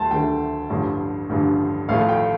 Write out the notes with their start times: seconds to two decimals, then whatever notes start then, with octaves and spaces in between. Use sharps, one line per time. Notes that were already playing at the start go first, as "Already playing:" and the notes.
Already playing: D2 A3 A5 C6
0.11 D2 D3 A3 G5
0.70 A1 G2 D3 F3
1.29 A1 G2 D3 F3
1.89 A1 A2 F3 A3 F5
2.09 G5